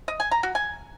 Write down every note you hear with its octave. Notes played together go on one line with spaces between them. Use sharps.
D#5
G#5
A#5
F#4
G#5